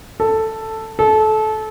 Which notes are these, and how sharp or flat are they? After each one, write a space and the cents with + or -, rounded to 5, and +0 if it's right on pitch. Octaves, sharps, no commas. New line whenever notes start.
A4 +5
A4 -25